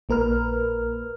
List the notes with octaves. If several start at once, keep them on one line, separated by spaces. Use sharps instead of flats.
A#1 A#3 A#4 B4 F6